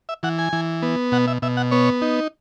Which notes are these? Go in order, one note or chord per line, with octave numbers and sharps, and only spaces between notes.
E5
E3 F#5
G#5
E3
B3
B2 F#5
E5
B2 E5
F#5
B3 C#5
D#4